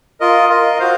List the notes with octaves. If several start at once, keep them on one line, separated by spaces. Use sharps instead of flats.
F4 A#4 D#5
F4 A#4 D#5
F#4 C5 F5